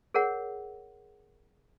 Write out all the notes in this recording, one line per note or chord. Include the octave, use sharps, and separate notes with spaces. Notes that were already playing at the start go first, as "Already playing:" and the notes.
G#4 A#4 C#5 F#5